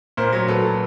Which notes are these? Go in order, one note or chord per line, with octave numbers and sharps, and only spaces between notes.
A#2 A#4 C5
F#3
A#2 A4 B4
F#3